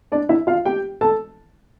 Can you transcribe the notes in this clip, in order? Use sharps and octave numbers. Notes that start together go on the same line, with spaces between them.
D4 D5
E4 E5
F4 F5
G4 G5
A4 A5